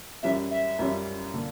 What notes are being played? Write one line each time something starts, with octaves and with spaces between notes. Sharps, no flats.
F#2 E3 G3 C#4 E5
E5
F#2 E3 G3 C#4
D3 A#3